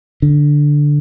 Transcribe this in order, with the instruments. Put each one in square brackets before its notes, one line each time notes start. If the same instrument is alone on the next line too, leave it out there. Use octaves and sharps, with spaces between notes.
[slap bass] D3